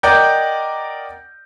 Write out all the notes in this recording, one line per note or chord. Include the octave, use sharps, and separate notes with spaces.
A#4 D5 D#5 F#5 G5 G6